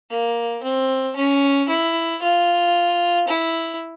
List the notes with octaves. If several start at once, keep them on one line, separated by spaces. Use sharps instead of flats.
A#3
C4
C#4
E4
F4
E4